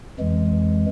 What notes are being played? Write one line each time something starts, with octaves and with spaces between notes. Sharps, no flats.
F2 E3 G#3